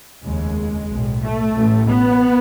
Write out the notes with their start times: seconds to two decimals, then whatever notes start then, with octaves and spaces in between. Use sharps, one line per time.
0.22 F1 D#2 C#3 G#3
0.88 B1 A2
1.20 A3
1.53 A1 A2
1.86 B3